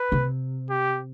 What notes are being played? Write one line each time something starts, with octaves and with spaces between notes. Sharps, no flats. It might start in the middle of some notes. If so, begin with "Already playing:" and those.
Already playing: B4
C3
G4